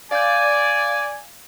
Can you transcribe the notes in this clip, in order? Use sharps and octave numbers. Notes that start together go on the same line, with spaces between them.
D5 F5 G#5 G6